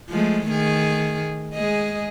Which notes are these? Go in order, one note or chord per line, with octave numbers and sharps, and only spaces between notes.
F3 G#3 A3
D#3 A3 G#4
G#3 G#4 D#5